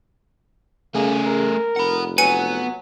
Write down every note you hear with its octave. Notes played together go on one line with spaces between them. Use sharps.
C#3 A3 A#3 G#4
A#4
F1 F#5 B5
F#3 B3 B4 G#5 C#7 D#7